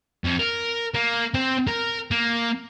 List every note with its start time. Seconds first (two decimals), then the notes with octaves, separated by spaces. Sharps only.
0.24 F2
0.39 A#4
0.94 A#3
1.34 C4
1.68 A#4
2.11 A#3